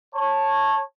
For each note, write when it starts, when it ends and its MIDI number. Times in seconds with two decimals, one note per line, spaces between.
0.14 0.81 73
0.14 0.81 81